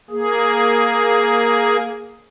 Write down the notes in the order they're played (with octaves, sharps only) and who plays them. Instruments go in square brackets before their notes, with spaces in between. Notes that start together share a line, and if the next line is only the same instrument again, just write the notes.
[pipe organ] A#3 G#4